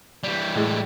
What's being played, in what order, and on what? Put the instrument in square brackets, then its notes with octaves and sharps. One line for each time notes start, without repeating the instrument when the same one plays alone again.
[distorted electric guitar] E3 G3
[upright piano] A2 G#3